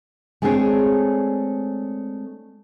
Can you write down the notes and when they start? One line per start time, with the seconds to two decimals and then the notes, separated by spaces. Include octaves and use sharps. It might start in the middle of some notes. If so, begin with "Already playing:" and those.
0.42 G#3 A3 C4 D4 G#4 C#5